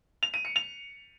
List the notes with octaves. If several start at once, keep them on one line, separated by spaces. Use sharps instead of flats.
F7
D#7
C#7
F7